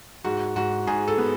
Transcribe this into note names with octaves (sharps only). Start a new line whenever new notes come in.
G#2 F#4
G#2 F#4
G#2 G#4
A4
B3